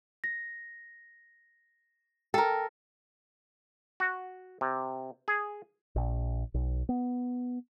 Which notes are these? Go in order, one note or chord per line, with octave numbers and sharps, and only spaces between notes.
A#6
A4 A#4 G5
F#4
C3
G#4
A#1
B1
B3